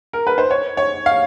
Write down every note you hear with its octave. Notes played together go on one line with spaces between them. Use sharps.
A#4
B4
C5
C#5
C#5
F5